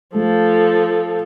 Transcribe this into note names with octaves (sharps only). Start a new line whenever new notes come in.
F3 A3 A4